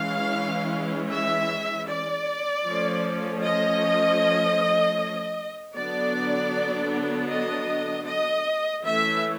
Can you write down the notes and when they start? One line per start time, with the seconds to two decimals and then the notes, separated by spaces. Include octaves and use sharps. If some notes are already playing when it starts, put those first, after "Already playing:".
Already playing: E3 G#3 C#4 F5
1.10 E5
1.88 D5
2.65 F3 A3 C#4
3.43 D#5
5.75 D3 F#3 B3 D4 D5
7.30 D#5
8.06 D#5
8.84 E3 A3 C#4 E5